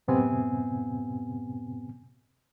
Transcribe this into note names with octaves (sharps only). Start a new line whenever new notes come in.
F#2 A2 C3 B3 C4 G#5